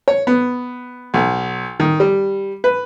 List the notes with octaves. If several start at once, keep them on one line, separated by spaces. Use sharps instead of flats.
C#5
B3
B1
D#3
G3
B4